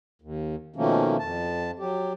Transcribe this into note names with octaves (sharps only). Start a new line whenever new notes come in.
D#2
B2 D#3 F3 A3 A#3 C#4
F2 A5
F#3 G4